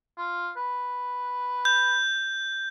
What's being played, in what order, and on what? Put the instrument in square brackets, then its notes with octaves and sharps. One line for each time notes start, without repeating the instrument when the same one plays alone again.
[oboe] F4
B4
[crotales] G6